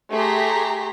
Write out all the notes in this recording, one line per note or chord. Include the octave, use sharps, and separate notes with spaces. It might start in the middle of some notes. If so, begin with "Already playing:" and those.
A3 G4 G#4 A#5 C6 B6